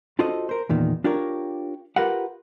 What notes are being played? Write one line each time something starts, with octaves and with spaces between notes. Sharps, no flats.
D4 F4 F#4 A4 C5 D#5
A#4 C5
E2 A#2 D#3
D4 F4 G4 A#4 C#5
F4 G4 A#4 B4 F5 F#5